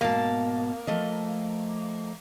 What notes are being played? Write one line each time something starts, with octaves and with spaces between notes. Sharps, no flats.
G#2 B2 A#3 A5
F3 A3 D#5